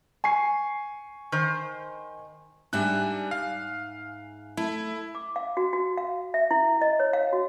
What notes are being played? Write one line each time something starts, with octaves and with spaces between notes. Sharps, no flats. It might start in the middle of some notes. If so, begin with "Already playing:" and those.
G#5 C#6 C7
D#3 C5
G#2 G3 D4 E5 G#5 F#6
F5
A3 E4
D6
F5
F#4
F#4
F5
E5
E4
D#5
C#5
F5
F#4